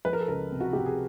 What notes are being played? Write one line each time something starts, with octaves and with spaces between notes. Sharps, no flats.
F3 B4
A#4
A4
C#2 A#4
C3
F#4
C3 G4
G#4